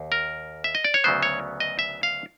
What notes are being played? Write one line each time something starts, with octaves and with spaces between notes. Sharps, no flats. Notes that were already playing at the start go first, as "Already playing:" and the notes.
Already playing: D#2
A#4
E5
D#5
D5
C#5
D2 C#3 F#3 B3 C5
C#5
D#5
E5
F5